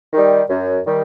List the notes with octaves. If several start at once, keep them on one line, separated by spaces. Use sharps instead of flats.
D#3 G3
F#2
D#3 G3